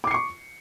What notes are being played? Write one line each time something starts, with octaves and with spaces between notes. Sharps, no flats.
C#6 D6 C7 C#7